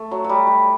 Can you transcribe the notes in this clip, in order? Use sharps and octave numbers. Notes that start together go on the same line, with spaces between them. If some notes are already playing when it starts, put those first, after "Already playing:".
Already playing: A3
F#3
F#3 G3
G3